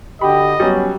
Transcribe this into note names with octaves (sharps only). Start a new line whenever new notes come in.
D3 F#4 G4 D#5 B5
F#3 G3 B3 C#4